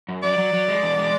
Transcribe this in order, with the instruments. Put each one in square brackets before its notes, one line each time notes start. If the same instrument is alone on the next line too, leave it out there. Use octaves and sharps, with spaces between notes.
[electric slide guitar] F#2
[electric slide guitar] F#3 [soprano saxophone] D5
[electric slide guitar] F#3
F#3
G#3
E2
G#3